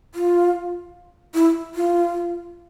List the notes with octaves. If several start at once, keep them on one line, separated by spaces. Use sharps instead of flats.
F4
E4
F4